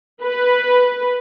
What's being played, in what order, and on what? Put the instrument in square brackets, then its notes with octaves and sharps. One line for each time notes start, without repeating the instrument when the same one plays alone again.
[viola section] B4